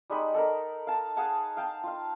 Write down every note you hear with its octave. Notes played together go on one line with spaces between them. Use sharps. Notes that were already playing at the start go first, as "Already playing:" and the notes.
G3 G#3 D#4 B5
A4 A#4 B5
F5 A5
G#4 F5 F#5 A5
F5 G5 A5
F4 F5